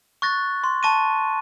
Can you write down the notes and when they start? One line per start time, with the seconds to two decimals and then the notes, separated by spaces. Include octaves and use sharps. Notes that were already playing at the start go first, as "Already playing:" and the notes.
0.22 C#6 F#6 A6 A#6
0.64 C6
0.83 A5 C#6 A#6 D#7